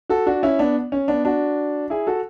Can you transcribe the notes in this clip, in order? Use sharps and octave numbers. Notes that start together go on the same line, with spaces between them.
F#4 A4
D4 F#4
C#4 E4
B3 D4
C#4
B3 D4
D4 F#4
E4 G#4
F#4 A4